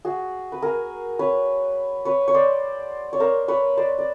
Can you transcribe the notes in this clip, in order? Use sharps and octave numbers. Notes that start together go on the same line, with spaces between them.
F#4 G#4
B4
G#4 A#4
B4 C#5
B4 C#5
C#5
C5 D5
C#5
A#4 C5
B4 C#5
C5 D5
D5